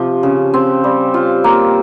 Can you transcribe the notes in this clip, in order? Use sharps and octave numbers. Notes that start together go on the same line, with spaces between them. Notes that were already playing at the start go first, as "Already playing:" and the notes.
Already playing: C3 F3
C#3
C4
G3
F4
A#3